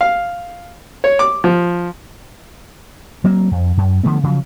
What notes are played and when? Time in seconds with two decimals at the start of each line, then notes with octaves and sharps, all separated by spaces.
0.01 F5
1.04 C#5
1.19 D6
1.44 F3
3.24 F#3 A#3 C4
3.51 F2
3.77 F#2
4.03 D3 F3 A3 B3
4.23 C#3 F3 F#3